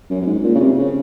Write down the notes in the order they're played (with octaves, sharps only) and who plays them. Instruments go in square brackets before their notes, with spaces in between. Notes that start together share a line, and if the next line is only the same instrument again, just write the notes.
[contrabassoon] F#2
F#2
G#2
A#2
C#3
C3
C#3